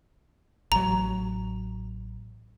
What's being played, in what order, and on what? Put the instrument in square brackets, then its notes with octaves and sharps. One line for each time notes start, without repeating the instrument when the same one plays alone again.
[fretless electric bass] A1 F#3 [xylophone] A#5